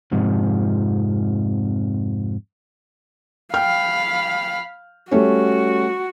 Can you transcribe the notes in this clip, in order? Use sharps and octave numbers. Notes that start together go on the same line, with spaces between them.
F2 G#2 C3 F3
F5 G5 B5 F6
G3 A3 C#4 F#4